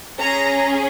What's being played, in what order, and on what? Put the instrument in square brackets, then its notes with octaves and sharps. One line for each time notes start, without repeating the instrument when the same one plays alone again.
[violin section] C#4 G#4 A#5